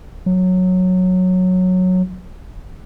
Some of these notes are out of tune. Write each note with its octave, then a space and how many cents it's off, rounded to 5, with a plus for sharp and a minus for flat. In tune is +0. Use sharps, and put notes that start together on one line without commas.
F#3 -10